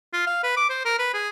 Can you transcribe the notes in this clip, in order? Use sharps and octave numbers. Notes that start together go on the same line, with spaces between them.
F4
F5
B4
D6
C5
A#4
B4
G#4